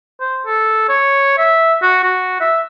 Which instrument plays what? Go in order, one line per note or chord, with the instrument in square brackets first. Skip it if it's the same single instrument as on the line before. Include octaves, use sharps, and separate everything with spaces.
[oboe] C5
A4
C#5
E5
F#4
F#4
E5